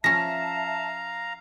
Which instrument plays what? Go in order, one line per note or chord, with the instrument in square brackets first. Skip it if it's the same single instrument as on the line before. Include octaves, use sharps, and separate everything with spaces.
[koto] F3 C#4 [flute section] E5 A5 [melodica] F5 A#5 [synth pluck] A#6